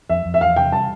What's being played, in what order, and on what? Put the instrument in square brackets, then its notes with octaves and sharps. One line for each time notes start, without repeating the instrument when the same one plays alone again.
[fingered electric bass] F2 [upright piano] E5
[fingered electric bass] F2
[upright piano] E5
[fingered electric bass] E2 [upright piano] F5
[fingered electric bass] C3 [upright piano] G5
[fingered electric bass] G3 [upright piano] A5